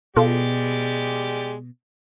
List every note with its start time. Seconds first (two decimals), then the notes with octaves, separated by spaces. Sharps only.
0.16 B2 G#3 F4 G4 A4 D5